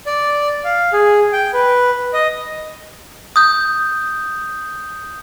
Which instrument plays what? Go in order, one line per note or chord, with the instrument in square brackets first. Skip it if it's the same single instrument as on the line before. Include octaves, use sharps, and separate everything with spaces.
[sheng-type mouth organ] D5
F5
G#4
G5
B4
D#5
[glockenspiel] D#6 G6